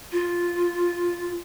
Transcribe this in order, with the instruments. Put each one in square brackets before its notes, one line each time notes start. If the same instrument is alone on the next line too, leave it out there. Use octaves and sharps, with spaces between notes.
[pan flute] F4